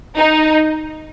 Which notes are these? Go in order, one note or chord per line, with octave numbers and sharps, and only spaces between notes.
D#4